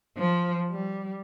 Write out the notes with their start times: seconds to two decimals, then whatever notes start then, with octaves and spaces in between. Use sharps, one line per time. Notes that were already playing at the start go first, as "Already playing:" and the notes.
0.17 F3
0.70 G3